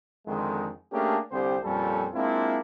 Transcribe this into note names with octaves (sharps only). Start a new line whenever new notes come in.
F2 D3 D#3 G#3
A3 A#3 C#4 D4 G4 G#4
C2 D3 C4 G4 C5
F2 A#2 G3 C#4 A4
G#3 A#3 C4 D4 E4 F4